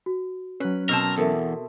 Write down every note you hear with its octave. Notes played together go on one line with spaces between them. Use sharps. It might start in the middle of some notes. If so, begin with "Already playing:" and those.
F#4
F#3 C#4 B4
B2 C4 A#4 A5
E2 A4 A#4 E5